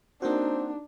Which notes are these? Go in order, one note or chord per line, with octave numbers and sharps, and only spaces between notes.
A#3 C4 D4 D#4 F#4